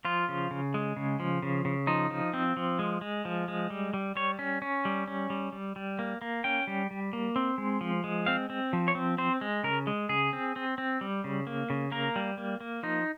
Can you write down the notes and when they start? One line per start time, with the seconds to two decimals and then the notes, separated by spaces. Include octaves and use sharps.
0.05 F3 F4
0.29 C#3
0.51 C#3
0.74 G#3
0.97 C#3
1.20 F3
1.42 C#3
1.65 C#3
1.87 F3 D#4
2.11 F3
2.34 C4
2.57 F3
2.79 G#3
3.01 G#3
3.25 F3
3.48 G#3
3.70 G3
3.94 G3
4.16 G3 C#5
4.39 C#4
4.62 C#4
4.85 G3
5.07 C#4
5.30 G3
5.52 G3
5.76 G3
5.99 A#3
6.22 A#3
6.44 C#4 G5
6.67 G3
6.91 G3
7.13 A#3
7.36 C4
7.58 G#3
7.81 F3
8.04 G#3
8.26 C4 F5
8.50 C4
8.73 F3
8.88 C#5
8.95 C4
9.18 C4 C5
9.41 G#3
9.63 C#3 A#4
9.87 G#3
10.09 C#3 G#4
10.33 C4
10.56 C4
10.78 C4
11.01 G3
11.24 C#3
11.47 A#3
11.70 C#3
11.92 A#3 A#4
12.16 G3
12.38 A#3
12.60 A#3
12.83 F3 D#4